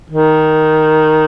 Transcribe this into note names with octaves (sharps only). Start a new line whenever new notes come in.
D#3